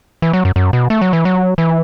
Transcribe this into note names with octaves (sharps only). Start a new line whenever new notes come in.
E3
F#3
F#2
F#2
B2
A3
F#3
E3
F#3
E3